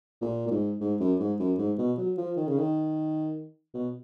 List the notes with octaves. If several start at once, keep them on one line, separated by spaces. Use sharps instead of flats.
A#2
A#2
G#2
G#2
F#2
G#2
F#2
G#2
B2
F#3
F3
D#3
C#3
D#3
B2